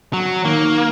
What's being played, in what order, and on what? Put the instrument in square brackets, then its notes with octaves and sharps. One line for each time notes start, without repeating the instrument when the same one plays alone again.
[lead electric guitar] F#3
[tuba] D#3 [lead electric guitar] A#3